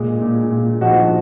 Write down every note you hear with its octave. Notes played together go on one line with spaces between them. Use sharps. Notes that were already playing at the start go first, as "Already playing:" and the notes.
Already playing: A#2 G#3
A#2
A#2
F3 D#4 F#4